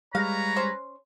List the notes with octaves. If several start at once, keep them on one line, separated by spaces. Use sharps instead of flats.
G3 G#3 B4 C#5 F5 A#5
C#4 C5